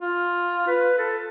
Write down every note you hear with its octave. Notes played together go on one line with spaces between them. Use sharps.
F4
B4
A4